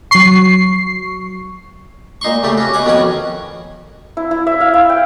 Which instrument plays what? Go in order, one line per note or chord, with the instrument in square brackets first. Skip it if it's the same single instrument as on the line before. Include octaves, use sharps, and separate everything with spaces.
[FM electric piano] F#3 C#6 [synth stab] C7
[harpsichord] A#2 D#4 C6 C#6
C#3 A3 G4
C#4 F#4
B2 F#5 G#5 D6
F2 B2 D#3 C#4 F#5 G#5
[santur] E4
E4
E5
F5
E4
G5